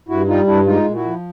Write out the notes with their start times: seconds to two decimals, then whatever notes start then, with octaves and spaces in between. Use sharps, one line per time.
0.09 G2 E4 F#4
0.28 G3 D#4 F4
0.47 G2 D4 E4
0.66 G#3 D#4 F4
0.85 A#2
0.95 E4 F#4
1.04 F3